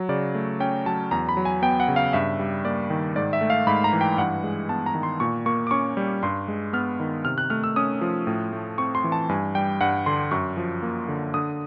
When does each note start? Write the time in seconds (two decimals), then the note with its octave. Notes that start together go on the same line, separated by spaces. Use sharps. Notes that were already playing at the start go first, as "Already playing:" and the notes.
Already playing: F#3
0.09 C#3 D5
0.34 A3
0.60 C#4 G5
0.86 F#3 A5
1.11 E2 A#5
1.29 B5
1.37 F#3
1.45 G#5
1.62 B3 G5
1.80 F#5
1.88 C#3
1.96 F5
2.13 G2 E5
2.39 G3
2.65 A#3 D5
2.90 D#3
3.16 G#2 D5
3.33 E5
3.41 A3
3.50 F5
3.67 G#2 B5
3.84 A#5
3.93 E3
4.01 G5
4.18 G2 F#5
4.44 G#3
4.69 B3 A5
4.86 A#5
4.95 D#3
5.03 C6
5.20 A#2 C#6
5.46 A#3 C#6
5.67 D6
5.71 C#4 C#6
5.97 G3
6.23 G2 C6
6.48 G#3
6.73 B3 F6
7.00 D#3
7.25 C3 F6
7.38 F#6
7.50 A3 F6
7.64 E6
7.76 C#4 D#6
8.01 F3
8.27 A2
8.52 A3
8.78 C4 C#6
8.95 C6
9.04 E3
9.12 A5
9.29 G2 G#5
9.55 G3 G5
9.81 G2 F#5
10.06 D3 C6
10.31 F#2 C#6
10.57 F3
10.83 A#3
11.08 D3
11.34 D3 D#6